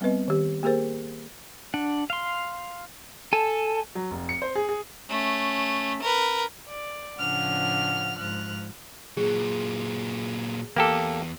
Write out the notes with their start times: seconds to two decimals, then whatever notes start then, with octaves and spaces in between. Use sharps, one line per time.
0.01 G3 B3 C4 B4 D#5
0.28 D#3 G4
0.63 A#3 G4 G#4 A#4 C5
1.74 D4 F#5
2.10 F5 C6
3.33 A4 G#5 A5
3.95 F#3
4.11 F1
4.29 C#7
4.42 C5
4.55 G#4
4.69 G#4
5.09 A3 C#4
6.02 A#4 B4
6.67 D5
7.18 A2 C#3 F3 D4 F#5 F6
8.17 G#2 F3 F6 F#6
9.17 A#2 F#3 G#4
10.76 E2 A#3 G4 A4